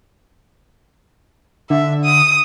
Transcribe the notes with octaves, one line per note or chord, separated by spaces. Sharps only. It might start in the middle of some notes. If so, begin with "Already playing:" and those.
D3 E5
D#6